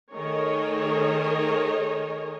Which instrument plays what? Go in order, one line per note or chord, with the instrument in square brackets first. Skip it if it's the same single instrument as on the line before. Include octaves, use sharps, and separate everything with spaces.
[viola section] D#3 A3 G#4 A#4 C#5 D#5